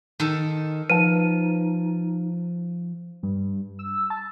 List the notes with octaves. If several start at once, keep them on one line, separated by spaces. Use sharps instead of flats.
D#3 A4
F3 D#4 B4 A5 D#7
G2
E6
A5